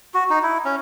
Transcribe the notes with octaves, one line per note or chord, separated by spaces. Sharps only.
F#4
D#4
E4
C#4